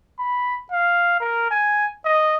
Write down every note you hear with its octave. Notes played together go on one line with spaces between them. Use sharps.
B5
F5
A#4
G#5
D#5